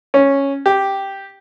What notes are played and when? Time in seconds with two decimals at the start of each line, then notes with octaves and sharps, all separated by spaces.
0.14 C#4
0.66 G4